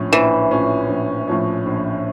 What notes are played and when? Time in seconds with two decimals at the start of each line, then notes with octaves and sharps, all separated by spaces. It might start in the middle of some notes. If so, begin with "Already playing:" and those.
Already playing: A#1 A2 F3 C#4
0.12 A#1 E3
0.51 A2 F3 C#4
0.89 A#1
1.28 A2 F3 C#4
1.66 A#1